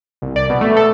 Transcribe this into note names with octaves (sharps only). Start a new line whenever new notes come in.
C2
D5
B2
A3
A4